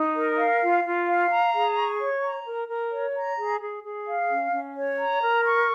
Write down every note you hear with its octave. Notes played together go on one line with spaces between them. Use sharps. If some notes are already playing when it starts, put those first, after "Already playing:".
Already playing: D#4
A#4
F5
F4
F4
F5
A#5
G#4
C#6
C#5
A#5
A#4
A#4
C#5
A#5
G#4
G#4
G#4
F5
C#4
C#4
C#5
A#5
A#4
C#6